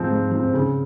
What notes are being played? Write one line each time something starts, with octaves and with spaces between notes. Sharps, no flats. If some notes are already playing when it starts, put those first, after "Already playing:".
Already playing: G#2 F3 C4
G#2
F3 C4
C#3